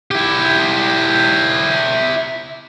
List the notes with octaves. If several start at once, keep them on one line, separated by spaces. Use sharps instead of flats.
E4 G4